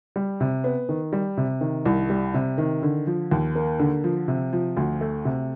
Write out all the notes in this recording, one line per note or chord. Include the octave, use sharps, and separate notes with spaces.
G3
C3
B3
D#3
G3
C3
D#3
C2
G3
C3
D#3
D3
F3
D#2
A#3
D3
F3
C3
F3
D2
A3
C3